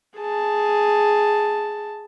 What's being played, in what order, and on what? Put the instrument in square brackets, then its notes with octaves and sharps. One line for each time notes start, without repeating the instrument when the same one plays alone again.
[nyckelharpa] G#4 A5